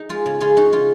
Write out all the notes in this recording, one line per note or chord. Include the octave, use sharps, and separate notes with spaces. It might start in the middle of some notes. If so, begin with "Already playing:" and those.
Already playing: D#4 G#4
G#3 F4
C#3
C#3 F4 G#4
C#3 D#4 F#4
C#3 F4